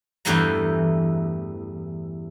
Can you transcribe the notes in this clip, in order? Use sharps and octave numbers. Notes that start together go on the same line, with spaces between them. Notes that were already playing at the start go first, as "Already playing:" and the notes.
E2 G2 E3 G3 A3 A#5